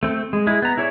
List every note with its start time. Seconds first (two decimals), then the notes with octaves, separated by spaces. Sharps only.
0.03 A3 C4
0.33 G#3
0.47 G#3 E4
0.62 B3 A#5
0.77 E4 G#4 C#5 D5 E5